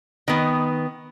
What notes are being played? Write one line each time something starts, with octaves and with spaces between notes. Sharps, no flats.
D#3 B3